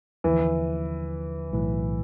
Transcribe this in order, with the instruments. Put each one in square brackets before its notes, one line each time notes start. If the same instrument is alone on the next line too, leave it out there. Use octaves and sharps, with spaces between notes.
[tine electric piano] D#2 D3 F3 [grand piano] E3
[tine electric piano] B1 A2 E3